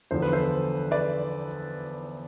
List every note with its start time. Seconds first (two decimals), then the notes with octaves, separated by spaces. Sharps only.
0.11 E2 D3 F3 C5
0.22 B4
0.32 A4 C5
0.91 B4 D5